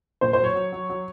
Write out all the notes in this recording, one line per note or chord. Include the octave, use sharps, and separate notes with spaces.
A#2 C5
C5
F#3
C#5
F#3
F#3
F#3